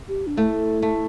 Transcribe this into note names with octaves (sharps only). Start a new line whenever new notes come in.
G4
D4
A3 E4
A3